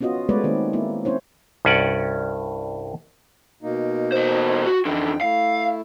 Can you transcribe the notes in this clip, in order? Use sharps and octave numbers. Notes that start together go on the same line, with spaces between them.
B3 C#4 F4 F#4 D#5
G#3 A3 B3 B4 C#5 D5
D#3 A#3 C4
A#3 E4
C4 C#4 E4 C5 C#5
C2 G2 C#4 F#4 D5 F#5
B2 A#3 D#4
E2 C5
F#4
F2 D3 E3 G5
A3 E4 F5